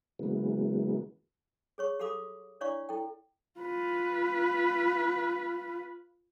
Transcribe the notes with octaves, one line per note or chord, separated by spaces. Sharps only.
C#3 E3 F#3 G#3 A#3 B3
G#4 C#5 C#6
G4 A4 F5 B5 D6 D#6
D4 E4 C#5 D5 F5 C#6
E4 A4 G5
F4 B4